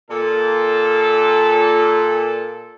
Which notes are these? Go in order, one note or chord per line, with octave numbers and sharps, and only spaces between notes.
A#2 A4